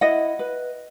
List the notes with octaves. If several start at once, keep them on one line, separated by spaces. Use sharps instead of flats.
E4 D#5 F#5
B4